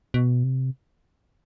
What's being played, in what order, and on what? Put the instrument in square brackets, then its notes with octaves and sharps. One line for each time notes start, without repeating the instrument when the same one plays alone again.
[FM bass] B2
C3